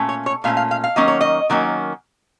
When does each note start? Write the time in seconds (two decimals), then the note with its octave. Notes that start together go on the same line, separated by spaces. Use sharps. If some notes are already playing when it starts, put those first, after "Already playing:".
Already playing: A#2 A3 C#4
0.09 C#5
0.26 C#5
0.44 A#2 A3 C#4 F5
0.57 F5
0.71 F5
0.84 F5
0.96 D#3 F#3 A#3 C#4 D#5
1.08 C#5
1.21 D#5
1.50 D#3 F#3 A#3 C#4